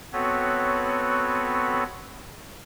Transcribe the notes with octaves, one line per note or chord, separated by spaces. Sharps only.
B3 C4 F#4 A4 B4 C#5